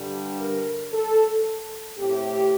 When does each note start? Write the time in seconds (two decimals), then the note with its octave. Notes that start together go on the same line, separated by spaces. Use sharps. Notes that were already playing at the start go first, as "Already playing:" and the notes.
Already playing: G2 D3 G3
0.40 A#4
0.93 A4
1.99 A2 A3 C4 G4